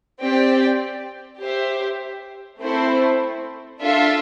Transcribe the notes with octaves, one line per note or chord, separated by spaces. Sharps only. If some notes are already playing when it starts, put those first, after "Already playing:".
C4 G4 D5 G5
G4 C5 E5
A3 C4 E4 A4 C5
D4 F4 A4 E5